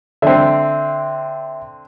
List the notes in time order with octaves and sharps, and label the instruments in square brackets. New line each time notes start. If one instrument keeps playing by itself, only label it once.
[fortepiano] D3 C4 [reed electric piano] E5